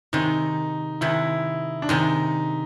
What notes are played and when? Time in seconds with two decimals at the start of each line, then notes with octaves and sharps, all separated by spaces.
0.13 C3 D#3 G#3 D#4
1.01 C3 D#3 G#3 E4
1.82 D4
1.89 C3 D#3 G#3 D#4